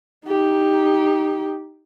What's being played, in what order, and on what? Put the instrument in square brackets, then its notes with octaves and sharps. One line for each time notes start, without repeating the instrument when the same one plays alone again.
[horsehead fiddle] D#4 G4